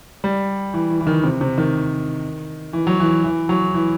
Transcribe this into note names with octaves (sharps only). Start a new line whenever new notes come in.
G3
E3
E3
E3
D#3
C3
C3
D#3
E3
F#3
E3
E3
F#3
E3